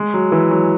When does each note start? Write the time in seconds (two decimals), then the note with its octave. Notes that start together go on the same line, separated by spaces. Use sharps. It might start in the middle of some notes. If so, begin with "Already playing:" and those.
Already playing: G#3
0.14 F#3
0.32 E3
0.51 F#3